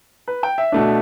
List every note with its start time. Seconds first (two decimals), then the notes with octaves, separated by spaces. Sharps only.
0.28 B4
0.43 G5
0.58 E5
0.72 B2 A3 D4